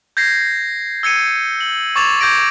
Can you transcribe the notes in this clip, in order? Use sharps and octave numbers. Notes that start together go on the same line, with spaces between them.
G6 G#6 A#6 C7
E6 G#6 C#7 D#7
F#7
C#6 D6 G#6 A6 E7 F7
D6 G6 G#6 A#6 D7